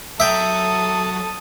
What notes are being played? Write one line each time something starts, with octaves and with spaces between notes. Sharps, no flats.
F#3 A4 E5 G5 A5 D#6